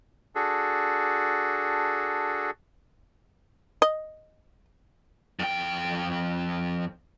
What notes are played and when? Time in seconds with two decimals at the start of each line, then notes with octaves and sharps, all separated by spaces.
0.35 D4 F#4 G#4 A4
3.82 D#5
5.39 F2 G5